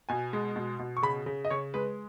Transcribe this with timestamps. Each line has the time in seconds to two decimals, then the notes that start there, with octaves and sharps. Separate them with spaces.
0.09 B2 G#5
0.33 G#3
0.56 B2
0.79 B2
0.97 C#6
1.03 C#3 B5
1.26 C#3
1.45 D#5
1.50 C#3 C#5
1.74 G#3 B4